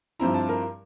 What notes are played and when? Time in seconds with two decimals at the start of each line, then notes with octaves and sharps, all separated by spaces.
0.19 G2 F3 C4 E4 A#5
0.34 A5
0.49 A#4